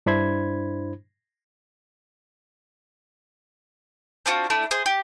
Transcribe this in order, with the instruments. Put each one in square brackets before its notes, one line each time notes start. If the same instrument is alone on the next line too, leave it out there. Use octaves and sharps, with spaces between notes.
[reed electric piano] G2 D4 E4 C5 B5 G#6
[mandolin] C4 D4 F4 F#4
A3 D4 E4
G#4 C5
G4